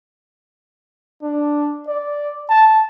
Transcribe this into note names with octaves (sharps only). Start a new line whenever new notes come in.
D4
D5
A5